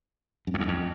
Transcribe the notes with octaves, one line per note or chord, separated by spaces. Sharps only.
F#2
F2
E2
F2